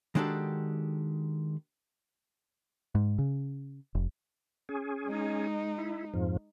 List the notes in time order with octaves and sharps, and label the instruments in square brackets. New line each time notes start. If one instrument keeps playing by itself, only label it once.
[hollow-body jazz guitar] D#3 G#3 D4 F#4 G4 A4
[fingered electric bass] G#2
C#3
F1
[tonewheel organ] C#4 G#4
[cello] G#3 D#4
[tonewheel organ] E4
F2 G#2 F3